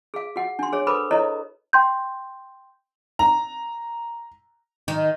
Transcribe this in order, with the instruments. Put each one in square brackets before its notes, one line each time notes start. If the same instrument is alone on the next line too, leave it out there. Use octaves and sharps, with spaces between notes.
[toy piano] G#4 F5
F#4 F#5
D4 C6
G#4 C#5
A4 B4 C5 B5 D6
E4 A4 C#5 D#5 A#5
[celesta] G5 C6 G6
[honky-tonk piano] A#5
[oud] D#3